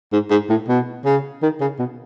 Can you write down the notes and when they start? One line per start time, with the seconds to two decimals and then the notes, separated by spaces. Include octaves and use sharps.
0.12 G#2
0.30 G#2
0.49 A2
0.68 B2
1.05 C#3
1.42 D#3
1.61 C#3
1.79 B2